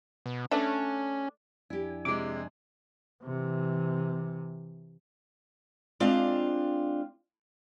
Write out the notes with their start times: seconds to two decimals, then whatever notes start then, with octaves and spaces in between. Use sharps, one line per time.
0.26 B2
0.51 A3 C#4 D4
1.70 F2 D4 E4 G4 G#5
2.05 C3 G#3 D6
3.23 C3 E3
6.00 G#3 C4 D4 F4 D5 F5